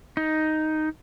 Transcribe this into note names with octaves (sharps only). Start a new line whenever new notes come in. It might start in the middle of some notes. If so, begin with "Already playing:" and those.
D#4